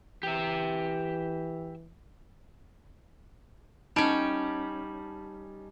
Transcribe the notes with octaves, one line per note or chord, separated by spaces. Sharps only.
E3 G4 E5
G3 C#4 D#4 A5 D7